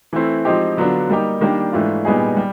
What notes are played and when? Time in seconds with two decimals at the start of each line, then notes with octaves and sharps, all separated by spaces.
0.13 E3 A3 C4 E4
0.45 F3 G#3 C4 D#4 G4
0.77 D3 F#3 B3 D4 F4
1.10 G3 A#3 D#4 G4
1.41 D#3 G3 A#3 D4 G4
1.72 G#2 E3 A3 D4 F4
2.05 A#2 G3 B3 D#4 G#4
2.37 G3